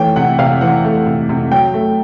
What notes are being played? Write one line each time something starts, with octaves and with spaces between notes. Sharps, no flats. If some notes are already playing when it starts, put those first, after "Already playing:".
Already playing: E3 A3 C#5 G5
C3 F#5
C3 F5
E3 F#5
A3
C3
C3
F#3 G5
A3